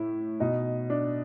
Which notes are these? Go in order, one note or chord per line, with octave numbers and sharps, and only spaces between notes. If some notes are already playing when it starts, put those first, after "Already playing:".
Already playing: A2 E4
B2 D#4
D4